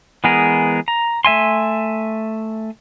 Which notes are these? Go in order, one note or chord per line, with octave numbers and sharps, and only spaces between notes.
E3 G#3 B3 G#4 A#4
A#5
A3 E5 G#5 C6